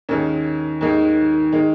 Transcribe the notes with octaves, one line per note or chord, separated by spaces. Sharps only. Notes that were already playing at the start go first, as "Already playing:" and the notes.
D#2 D#3 G#3 C#4
D#2 D#3 G#3
D#3 G#3